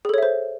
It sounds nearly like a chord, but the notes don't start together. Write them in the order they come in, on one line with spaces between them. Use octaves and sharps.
G#4 A4 C#5 E5 C5